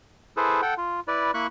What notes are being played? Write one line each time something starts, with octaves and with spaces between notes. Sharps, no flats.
E4 G#4 A4 B4 C5
A4 F#5 G5
F4
E4 B4 D5
A#3 E4 B5 C#6 F#6